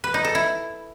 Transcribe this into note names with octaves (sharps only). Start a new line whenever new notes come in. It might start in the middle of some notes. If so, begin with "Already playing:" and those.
B4
D#4
A4
E4